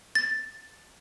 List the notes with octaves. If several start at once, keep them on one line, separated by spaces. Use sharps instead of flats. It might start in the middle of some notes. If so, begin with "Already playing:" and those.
A6